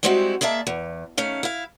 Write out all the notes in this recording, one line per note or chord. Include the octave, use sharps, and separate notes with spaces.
G3 G#3 C4 C#4 E4 F#4
G#3 A#3 D5 E5 A5
E2
D#3 A3 C#4 F5
E4 F5